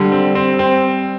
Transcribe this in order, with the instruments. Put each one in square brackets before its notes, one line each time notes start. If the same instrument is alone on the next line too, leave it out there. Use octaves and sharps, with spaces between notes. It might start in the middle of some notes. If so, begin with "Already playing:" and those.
Already playing: [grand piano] D3 [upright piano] G3
[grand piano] C4
C4
C4